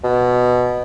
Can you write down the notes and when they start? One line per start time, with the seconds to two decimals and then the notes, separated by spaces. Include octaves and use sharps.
0.04 B2